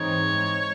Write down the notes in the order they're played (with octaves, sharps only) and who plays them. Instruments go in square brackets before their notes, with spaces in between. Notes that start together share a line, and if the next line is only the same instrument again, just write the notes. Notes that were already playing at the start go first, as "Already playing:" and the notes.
Already playing: [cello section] G#2 E3 G#3 C4 D#4 [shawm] C#5